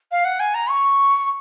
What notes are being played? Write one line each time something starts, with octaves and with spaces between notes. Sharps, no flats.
F5
F#5
G#5
A#5
C#6